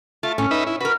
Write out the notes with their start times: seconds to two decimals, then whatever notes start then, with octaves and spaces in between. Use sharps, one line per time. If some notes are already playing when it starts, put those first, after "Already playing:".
0.23 A3 F4 A5
0.38 A2 C#4
0.51 D#4 B4 E5
0.67 E4
0.81 F#4 A#4 B4